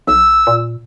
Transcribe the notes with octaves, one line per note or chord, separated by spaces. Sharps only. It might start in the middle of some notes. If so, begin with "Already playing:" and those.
B1 E6
A#2